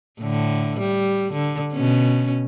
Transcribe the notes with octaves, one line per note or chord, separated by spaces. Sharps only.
A2 D3
G3
D3
B2 C#4